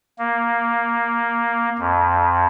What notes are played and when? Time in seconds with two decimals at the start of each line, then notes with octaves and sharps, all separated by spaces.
0.18 A#3
1.79 F2